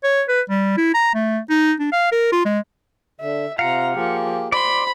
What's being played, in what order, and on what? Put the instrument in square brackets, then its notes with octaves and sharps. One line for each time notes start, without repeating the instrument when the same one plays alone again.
[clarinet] C#5
B4
G3
E4
A#5
A3
D#4
D4
F5
A#4
F4
G#3
[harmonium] D3 [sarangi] E5
[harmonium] C3 F4 [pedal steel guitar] F5 F#5 [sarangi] A#5
[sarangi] F3 [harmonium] A#3 G4 G#4
[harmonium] C5 [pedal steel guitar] D5 C6 [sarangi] B5